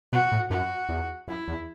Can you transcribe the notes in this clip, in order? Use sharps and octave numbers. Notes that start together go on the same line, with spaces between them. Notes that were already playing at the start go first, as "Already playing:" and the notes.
B2 F#4
A2
F#2 F#4
E2
F#2 E4
E2